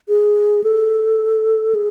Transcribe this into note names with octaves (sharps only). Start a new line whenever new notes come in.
G#4
A4
G#4